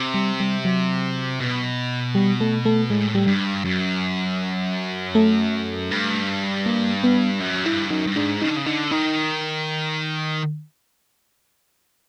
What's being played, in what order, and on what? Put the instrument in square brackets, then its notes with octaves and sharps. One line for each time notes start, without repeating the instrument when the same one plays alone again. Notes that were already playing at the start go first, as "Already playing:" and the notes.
Already playing: [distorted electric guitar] C3
[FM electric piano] G3
G3
F#3
[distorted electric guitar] B2
[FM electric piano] G3
A3
A3
[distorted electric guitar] A2 [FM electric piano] G#3
[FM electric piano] G3
[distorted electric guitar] G2
F#2
[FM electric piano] A3
[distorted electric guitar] G2
[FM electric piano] A#3
B3
[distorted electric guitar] F#2
[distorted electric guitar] G2 [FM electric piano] E4
[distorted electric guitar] F#2 [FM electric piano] D#4
[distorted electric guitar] G2
[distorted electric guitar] G#2 [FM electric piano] D4
[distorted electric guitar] C#3 [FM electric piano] D#4
[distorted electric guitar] D3
C#3
[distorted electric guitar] D3 [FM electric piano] D#4
[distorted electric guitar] D#3 [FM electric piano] D#4